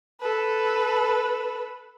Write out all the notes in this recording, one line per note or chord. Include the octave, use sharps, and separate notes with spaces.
A4 B4